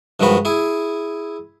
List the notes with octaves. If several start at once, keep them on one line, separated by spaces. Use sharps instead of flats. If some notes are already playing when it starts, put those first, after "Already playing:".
G2 D#3 F3 G#3 F#4 B5
E4 G#4